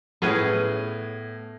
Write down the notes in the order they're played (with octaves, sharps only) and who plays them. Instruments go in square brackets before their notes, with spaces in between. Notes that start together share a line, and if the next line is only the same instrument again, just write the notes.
[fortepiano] A2 [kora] B3 C#4 G#4